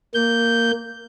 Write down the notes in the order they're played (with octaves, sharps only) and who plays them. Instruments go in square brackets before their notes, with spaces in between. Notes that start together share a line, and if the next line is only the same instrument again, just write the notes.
[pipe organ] A#3 G6